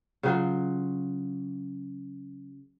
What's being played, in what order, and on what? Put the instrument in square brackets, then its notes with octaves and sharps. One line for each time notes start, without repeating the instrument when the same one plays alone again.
[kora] C#3 F#3 F4